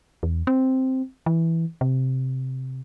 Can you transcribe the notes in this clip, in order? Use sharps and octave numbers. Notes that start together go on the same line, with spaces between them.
E2
C4
E3
C3